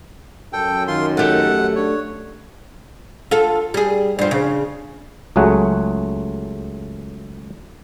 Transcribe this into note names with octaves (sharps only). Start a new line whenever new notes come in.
F#2 A4 G5
D#3 F4 C6
A3 G4 F#5
D4 C#5
F4 A4
G3 G#4
G2 F3
C#3
C#2 F#3 A3 G#4 F#5